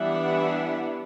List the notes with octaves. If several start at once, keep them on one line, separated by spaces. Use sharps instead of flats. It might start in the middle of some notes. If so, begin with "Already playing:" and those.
Already playing: E3 G3 B3 D4 E5 F#5